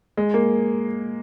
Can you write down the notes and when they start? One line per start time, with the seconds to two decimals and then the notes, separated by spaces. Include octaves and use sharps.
0.17 G#3
0.34 A#3